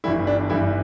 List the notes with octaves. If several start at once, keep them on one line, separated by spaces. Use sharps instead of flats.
G1 G2 E3 G3 E4
D4
G1 G2 E3 G3 E4